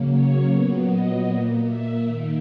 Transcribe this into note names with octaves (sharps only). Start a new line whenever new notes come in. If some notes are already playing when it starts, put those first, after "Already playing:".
Already playing: C#3 F#3 A#3
C#5
A#2 F#3 B3
D#5
A#2 A#3
E5
D#3 A#3